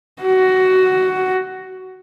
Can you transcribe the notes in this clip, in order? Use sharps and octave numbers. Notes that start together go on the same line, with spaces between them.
F#4